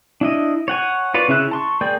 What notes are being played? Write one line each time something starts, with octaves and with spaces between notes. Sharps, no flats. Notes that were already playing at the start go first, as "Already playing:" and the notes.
D4 E4 D#5
C#5 F#5 G#5
F4 B4 C#5 D5
C#3 C#4 E4 E5 F#6
A5 C6 C#6
A#3 G#4 D5 G5 G6